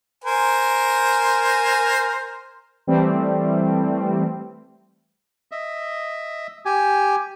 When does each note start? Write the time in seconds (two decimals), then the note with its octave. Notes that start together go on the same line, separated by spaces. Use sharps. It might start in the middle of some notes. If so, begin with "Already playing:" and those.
0.24 A#4 C5 G#5
2.87 E3 G3 A3 C4
5.51 D#5 E5
6.65 G4 G#5